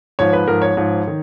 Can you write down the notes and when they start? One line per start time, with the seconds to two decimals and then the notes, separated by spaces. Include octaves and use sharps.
0.19 G#2 F3 C#5
0.33 B4
0.47 G#2 F3 A#4
0.62 C#5
0.77 G#2 F3 C#5
1.07 D#3